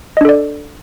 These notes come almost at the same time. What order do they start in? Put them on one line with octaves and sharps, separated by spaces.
D#5 D4 A4 D5